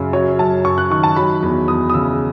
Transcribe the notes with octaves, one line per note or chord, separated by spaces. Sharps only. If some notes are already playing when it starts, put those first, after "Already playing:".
Already playing: F#2 C#3
F#3 C#5
F#2 A5
F#2 C#6
F#6
D#3 C#6
A5
F#3 B5
E2
E2 D#6
D#6
C#3 E6